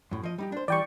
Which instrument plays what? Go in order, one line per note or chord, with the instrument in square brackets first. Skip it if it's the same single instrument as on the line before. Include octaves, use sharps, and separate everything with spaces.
[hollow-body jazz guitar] F#2 A2
F3 D#5
G3 D#4 G4
D4 C5
[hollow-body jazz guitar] E3 G3 [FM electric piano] D5 G5 C#6